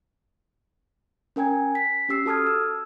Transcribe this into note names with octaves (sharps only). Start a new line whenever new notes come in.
C#4 A#4 G5 G#5 G#6
B6
C#4 G4 E6 C7
F#4 A4 A5 D#6 F6 G#6
E6